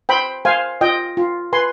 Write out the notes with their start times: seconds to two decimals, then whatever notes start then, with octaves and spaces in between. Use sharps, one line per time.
0.09 C5 G5 B5
0.45 C5 F5 G#5
0.81 F4 D#5 G5
1.17 F4
1.53 B4 G#5 C6